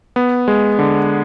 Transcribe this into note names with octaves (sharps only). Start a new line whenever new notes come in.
B3
G#3
D3